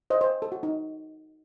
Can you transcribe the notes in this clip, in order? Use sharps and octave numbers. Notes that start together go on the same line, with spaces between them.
C5 D#5
C5
A4
F#4
D#4